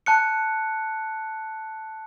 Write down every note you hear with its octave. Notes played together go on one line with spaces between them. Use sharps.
A5 F#6 C#7